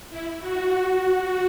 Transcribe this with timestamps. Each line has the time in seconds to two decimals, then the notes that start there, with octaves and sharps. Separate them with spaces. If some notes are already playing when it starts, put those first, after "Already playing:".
0.10 E4
0.40 F#4